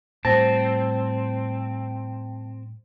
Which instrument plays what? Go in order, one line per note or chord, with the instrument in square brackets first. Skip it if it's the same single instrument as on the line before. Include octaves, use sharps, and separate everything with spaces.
[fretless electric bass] A2 G3 [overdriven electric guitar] C4 [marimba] C5 A#6 [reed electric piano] A5